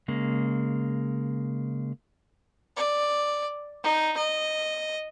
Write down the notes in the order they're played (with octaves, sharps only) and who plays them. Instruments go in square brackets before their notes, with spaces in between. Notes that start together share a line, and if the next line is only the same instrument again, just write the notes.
[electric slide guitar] C#3 G#3 A#3
[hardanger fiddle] D5
D#4
D#5